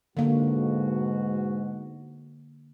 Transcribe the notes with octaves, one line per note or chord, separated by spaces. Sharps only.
G#2 B2 D3 A#3 F#4